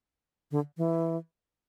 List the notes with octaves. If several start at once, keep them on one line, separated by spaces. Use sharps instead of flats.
D3
E3